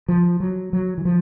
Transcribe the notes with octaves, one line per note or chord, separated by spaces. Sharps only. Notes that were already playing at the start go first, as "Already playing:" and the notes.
F3
F#3
F#3
E3
F3